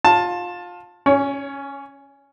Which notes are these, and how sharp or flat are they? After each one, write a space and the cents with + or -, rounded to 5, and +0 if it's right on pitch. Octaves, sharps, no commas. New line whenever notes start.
F4 +20 A5 +5
C#4 +0 C#5 +35